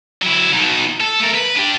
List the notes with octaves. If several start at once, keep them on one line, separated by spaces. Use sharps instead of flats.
F#3 E4
B2 D#4
A4
A3 A#4
B4
D4 G4